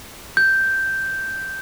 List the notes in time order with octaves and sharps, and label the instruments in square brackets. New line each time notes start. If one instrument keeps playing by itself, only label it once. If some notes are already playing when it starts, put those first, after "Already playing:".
[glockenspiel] G6